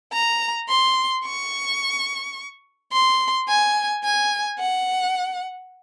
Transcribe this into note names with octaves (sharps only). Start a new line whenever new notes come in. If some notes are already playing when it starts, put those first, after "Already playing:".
A#5
C6
C#6
C6
G#5
G#5
F#5